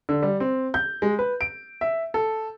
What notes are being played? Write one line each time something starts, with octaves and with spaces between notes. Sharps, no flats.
D3
G3
C4
G6
G#3
B4
D7
E5
A4